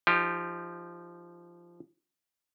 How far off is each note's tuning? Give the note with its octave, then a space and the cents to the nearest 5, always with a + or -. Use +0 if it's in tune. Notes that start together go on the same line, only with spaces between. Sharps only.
F3 -15 D#4 +0 G4 +20